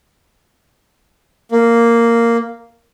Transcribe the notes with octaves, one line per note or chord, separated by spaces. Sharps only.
A#3